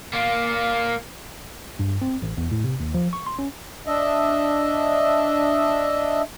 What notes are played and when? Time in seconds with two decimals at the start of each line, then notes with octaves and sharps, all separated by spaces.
0.13 A#3 F4
1.79 G2
2.02 C4
2.22 A1
2.37 E2
2.51 A2
2.64 C3
2.80 D#2
2.94 F3
3.13 C#6
3.26 C6
3.39 C#4
3.87 D4 D#5 E5